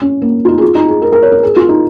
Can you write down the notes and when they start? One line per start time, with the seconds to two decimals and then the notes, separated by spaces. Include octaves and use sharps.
0.01 C#4
0.22 A#3
0.45 F4
0.48 D#4
0.58 G#4
0.62 F4
0.75 D#4
0.88 G#4
1.02 A#4
1.12 A#4
1.23 C#5
1.32 A#4
1.43 G#4
1.56 F4
1.69 D#4